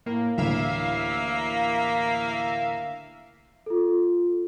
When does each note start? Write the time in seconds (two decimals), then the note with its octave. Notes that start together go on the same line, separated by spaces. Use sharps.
0.06 A2 A#3
0.38 A1 D2 D3 A#3 E5 F5
3.66 F4 A4